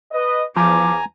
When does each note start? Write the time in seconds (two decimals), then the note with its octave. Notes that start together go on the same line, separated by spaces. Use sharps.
0.12 B4 D#5
0.56 E2 F3 G#5 A#5 D6